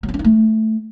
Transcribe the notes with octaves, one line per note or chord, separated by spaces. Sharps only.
F#3
C4
C#4
D#4
A3